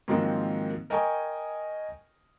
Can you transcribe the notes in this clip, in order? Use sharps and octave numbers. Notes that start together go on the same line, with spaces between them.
G#2 D#3 F3 F#3 A#3 C4
A#4 D#5 G5 G#5 A#5 C#6